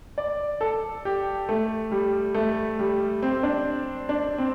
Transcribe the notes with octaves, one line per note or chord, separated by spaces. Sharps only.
D5
A4
G4
A3
G3
A3
G3
C4
D4
D4
C4